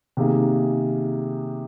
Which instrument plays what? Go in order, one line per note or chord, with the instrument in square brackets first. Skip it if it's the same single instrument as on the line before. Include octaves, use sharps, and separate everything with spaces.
[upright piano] C3 D#3 A#3 G#4